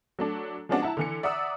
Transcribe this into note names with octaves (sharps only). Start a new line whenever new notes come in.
F#3 A3 D4
F3 G#3 B3 C#4 D4 F#4
E4 E5 F#5 A5 A#5
D3 E3 C#7
D5 E5 F#5 A#5 D#6 E6